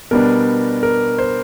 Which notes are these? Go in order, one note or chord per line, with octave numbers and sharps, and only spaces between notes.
B2 G3 B3 D4 A#4
A#4
C5